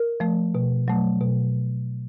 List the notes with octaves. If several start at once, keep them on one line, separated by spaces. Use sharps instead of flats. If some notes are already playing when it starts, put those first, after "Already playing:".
Already playing: A#4
F3 A3
B2
F#3 A3
B2